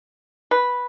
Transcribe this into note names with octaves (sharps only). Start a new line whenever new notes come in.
B4